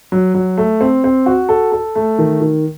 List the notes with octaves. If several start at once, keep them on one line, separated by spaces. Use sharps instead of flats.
F#3
F#3
A3
C4
C4
F#4
A4
A4
A3
D#3
D#3